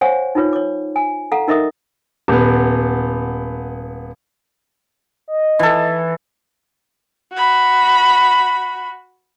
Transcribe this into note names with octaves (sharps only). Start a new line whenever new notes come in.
C5 C#5 F5 F#5 G#5 C#6
D#4 F4 B4 C#5
C#5 D6
G#5
A4 F5 F#5 A#5
D#4 A#4 D#5 E5 D6 D#6
D#1 B3
D#5
E3 A4
F#4 B5